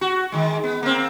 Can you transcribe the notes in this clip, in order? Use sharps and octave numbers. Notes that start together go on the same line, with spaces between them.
F#4
D#3 G#3
B3
A#3 C4